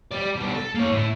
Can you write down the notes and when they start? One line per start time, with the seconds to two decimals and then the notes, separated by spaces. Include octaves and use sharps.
0.11 G3 D5
0.35 B2 G3
0.54 A4
0.75 A#3 C#5
0.92 A2 E4